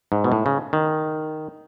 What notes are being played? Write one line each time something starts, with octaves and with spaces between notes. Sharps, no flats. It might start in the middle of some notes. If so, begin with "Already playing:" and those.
G#2
B2
A2
C#3
D#3